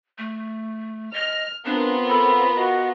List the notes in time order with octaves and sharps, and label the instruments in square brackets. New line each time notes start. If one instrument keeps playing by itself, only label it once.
[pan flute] A3
[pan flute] D#5 [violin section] F6
[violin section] B3 F4 A#4 [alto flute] C4 [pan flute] D4
[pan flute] A4 [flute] B5
[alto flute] F#4 [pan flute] D#5